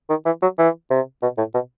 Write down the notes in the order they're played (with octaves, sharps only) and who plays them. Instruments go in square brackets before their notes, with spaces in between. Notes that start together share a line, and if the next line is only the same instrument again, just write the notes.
[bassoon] D#3
E3
F#3
E3
C3
B2
A2
B2